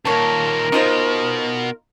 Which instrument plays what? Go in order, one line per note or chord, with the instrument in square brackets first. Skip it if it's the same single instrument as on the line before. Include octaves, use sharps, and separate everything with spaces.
[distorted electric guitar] D#2 A#2 [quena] A#4 [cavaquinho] C#5 A5
[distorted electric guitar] B2 [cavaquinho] D#4 F4 C5